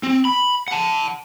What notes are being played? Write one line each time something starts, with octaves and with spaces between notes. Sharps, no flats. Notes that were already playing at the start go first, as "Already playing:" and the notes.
C4
B5
F#5 A5